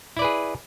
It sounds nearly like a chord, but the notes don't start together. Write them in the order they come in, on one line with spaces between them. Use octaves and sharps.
E4 D5 B4 G#4